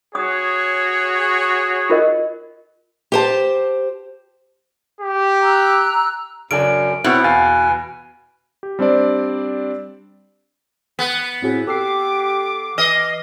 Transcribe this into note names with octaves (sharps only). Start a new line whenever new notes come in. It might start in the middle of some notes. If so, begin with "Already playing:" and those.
F#4 G#4 C#5 D#6
F4 A#4 D#5
G4 C5 A5
G4
A#5 E6 F#6
F#2 C#3 D4 G#5 D7
B2 B3 C4 E4 C#5
E2 F5 G#5 A6
G4
G3 C4 D4 C5 D5
B3
A2 C4 F#4 G#4
G4 A4 D6 E6 C7
E3 D#5 F6 C7